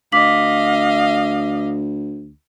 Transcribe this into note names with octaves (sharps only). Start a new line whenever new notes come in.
D2 D#5 F5 D6 B6 F#7